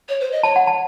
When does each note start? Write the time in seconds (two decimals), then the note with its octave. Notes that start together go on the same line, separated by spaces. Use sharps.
0.09 C#5
0.20 C5
0.32 D#5
0.43 C#5 A5
0.56 F#5
0.67 A5